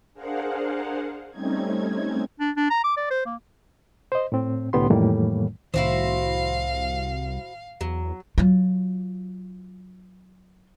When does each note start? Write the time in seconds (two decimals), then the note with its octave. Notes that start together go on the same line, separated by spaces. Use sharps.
0.13 D4 G#4 A#4 C5 F5 F#5
1.31 G3 A3 C4 C#4 D#4 G#6
2.40 D4
2.57 D4
2.70 A#5
2.84 D6
2.97 D5
3.10 C5
3.26 A#3
4.12 C5 D#5
4.32 A2 C4
4.73 C2 A2 D3 B3 G4 C6
4.90 F2 A2 D#3 E3 G3 A#3
5.74 C2 A2 D#3 E4 F#4 C5 F5
7.81 E2 F#3
8.38 F#3 F4